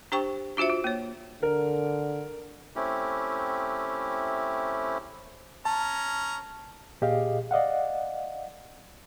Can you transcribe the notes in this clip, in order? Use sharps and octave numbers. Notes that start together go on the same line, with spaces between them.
D4 G4 C5 G5 C#6
D4 F4 F#4 C5 E5
F4
A#3 C#5
D3 A#4
A3 C4 C#4 E4 G4
C#4 A5 A#5
A#2 G4 G#4 D#5 F5
D5 D#5 F5 F#5